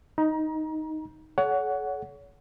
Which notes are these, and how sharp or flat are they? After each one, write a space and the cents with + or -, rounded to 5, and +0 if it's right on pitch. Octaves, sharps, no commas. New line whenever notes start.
D#4 +5 A#5 +30
A4 -45 C#5 +30 F#5 +0